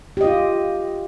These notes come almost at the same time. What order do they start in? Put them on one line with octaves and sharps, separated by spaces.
G4 D#5 F4